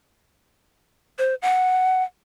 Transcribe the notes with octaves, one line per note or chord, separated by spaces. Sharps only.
C5
F#5